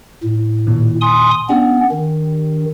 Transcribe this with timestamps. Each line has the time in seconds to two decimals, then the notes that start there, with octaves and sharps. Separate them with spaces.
0.23 A2
0.67 A#2 D#3
1.01 G#5 C6 D#6
1.49 B3 C#4 D4 G4
1.91 D#3